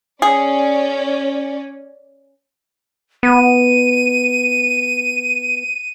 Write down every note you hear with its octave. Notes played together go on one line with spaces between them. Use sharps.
C#4 G#4 D5
B3 D#7